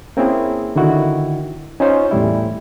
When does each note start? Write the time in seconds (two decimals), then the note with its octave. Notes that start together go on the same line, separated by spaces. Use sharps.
0.17 A#3 C4 C#4 E4 G#4
0.76 D3 D#3 E4 F#4
1.80 C#4 D#4 F4 C5 C#5
2.11 E2 A2 G3 E4